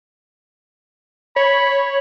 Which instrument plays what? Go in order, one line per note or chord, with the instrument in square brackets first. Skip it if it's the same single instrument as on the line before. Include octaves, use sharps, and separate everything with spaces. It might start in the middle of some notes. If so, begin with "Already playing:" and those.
[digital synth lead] C#5 [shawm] B5